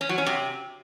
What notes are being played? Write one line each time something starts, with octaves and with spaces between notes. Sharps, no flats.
C#4
F#3
C#4
C3